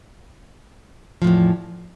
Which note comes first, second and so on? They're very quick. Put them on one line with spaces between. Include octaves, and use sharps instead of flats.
F3 A2 E2